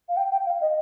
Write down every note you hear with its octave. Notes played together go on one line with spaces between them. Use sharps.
F5
G5
G5
F5
D#5